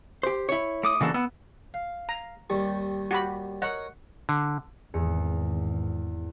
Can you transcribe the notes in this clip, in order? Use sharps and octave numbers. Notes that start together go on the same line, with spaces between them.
G4 C5
E4 C#5
A3 D6 D#6
C#3 E3 A#3 D4 F#4 A4
B3 F#5 E6
F5
A#5
D#2 G3 C#6
F#4 G4 B5
A#4 C#5 D#5 F#5
D3
G#1 E2 G#4 C#7